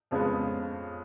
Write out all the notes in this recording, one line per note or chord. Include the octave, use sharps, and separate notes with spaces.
F2 C#3 F3 G#3 B3